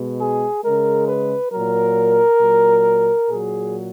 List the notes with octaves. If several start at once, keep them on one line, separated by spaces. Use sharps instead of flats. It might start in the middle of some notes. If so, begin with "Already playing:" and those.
Already playing: B2 G#3
G#4
C#3 G#3 A#4
B4
A#2 F#3 A#4
A#2 F#3
A#2 F#3 G#4